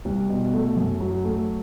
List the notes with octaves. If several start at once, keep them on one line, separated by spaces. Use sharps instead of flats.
C2
B2
A3
F#2
F#3
A3